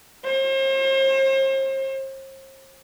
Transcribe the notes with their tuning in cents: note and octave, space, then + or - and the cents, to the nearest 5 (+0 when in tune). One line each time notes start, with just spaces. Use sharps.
C5 +40